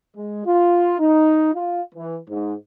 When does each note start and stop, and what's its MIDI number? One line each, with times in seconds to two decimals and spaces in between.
0.17 0.44 56
0.46 0.98 65
0.99 1.52 63
1.54 1.83 65
1.95 2.18 52
2.29 2.55 44